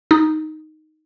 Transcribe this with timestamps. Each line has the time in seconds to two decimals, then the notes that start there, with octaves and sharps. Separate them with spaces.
0.11 D#4